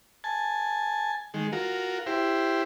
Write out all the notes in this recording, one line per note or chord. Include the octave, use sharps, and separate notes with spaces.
G#5 A5
D#3 G#3
F4 F#4 A#4
E4 G4 C5